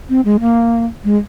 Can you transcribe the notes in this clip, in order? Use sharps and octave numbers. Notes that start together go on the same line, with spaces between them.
C4
G#3
A#3
G#3